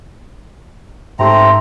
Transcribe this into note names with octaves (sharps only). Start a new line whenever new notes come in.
G#2 A3 C4 G4 A#5 C6